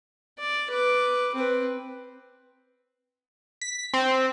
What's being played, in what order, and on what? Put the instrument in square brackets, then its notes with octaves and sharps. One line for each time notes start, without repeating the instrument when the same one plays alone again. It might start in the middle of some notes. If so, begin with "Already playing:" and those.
[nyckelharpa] D5
B4 D6
C4 B4
[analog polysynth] B6
C4